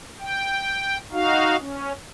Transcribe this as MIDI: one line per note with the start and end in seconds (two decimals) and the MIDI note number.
0.20 0.98 79
1.12 1.56 63
1.12 1.56 66
1.12 1.56 77
1.59 1.92 61